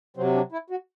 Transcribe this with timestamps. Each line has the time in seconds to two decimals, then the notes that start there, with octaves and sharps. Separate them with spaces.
0.17 C3 F#3 C4
0.34 D4
0.52 E4
0.70 F#4